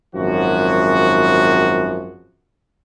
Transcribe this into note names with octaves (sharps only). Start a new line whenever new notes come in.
G#1 F#2 F3 F#4